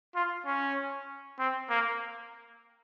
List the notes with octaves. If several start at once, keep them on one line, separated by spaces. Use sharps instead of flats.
F4
C#4
C4
A#3